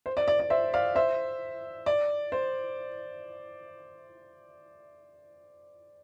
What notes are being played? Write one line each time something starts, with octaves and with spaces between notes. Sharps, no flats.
C5
D5
D5
D5
C5 E5
D5 F5
C5 E5
D5
C5